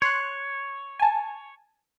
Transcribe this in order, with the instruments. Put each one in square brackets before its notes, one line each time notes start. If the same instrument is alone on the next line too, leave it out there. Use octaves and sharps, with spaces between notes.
[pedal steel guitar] C#5 [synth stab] C6 F#6
[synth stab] G#5 A5